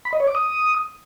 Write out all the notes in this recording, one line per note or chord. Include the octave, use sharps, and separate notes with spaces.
B5
D#5
C#5
D6
D#6